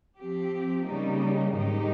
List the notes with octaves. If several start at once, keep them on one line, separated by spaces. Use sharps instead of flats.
F3 C4 G4
C#3 G3 A#3 D#4
G#2 D#3 G#3 D#4 G4